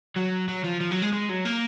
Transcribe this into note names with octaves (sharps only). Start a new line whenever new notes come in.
F#3
F#3
F3
F3
F#3
G#3
G#3
F#3
A#3